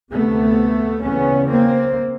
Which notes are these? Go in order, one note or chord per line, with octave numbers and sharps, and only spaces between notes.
D2 C3 A3 B3
E2 C#3 B3 C#4
A#3 C4